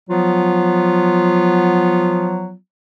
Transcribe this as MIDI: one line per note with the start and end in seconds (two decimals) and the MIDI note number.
0.09 2.54 53
0.09 2.54 54
0.09 2.54 59
0.09 2.54 65